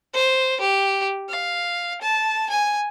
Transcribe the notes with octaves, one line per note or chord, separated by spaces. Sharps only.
C5
G4
F5
A5
G#5